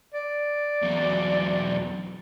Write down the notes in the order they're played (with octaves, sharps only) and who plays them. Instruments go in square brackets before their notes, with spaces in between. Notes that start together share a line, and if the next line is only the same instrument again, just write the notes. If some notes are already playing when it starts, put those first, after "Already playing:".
[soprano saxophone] D5
[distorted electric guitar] E2 F#3